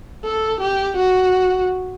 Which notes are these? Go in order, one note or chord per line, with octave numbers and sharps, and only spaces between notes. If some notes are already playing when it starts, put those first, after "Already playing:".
A4
G4
F#4